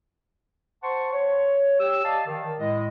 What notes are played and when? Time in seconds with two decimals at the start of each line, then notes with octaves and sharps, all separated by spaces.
0.83 C5 F#5 A5 C6 C#6
1.12 C#5
1.79 G4 E6
2.05 D5 D#5 F5 A5
2.27 D#3
2.59 A2 G#3 E4 D#5